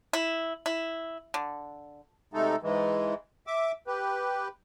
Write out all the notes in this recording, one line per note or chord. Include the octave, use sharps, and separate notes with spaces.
E4
E4
D3
C3 G#3 A3 D#4 A4
G#2 E3 G#3
E5 D6
G4 B4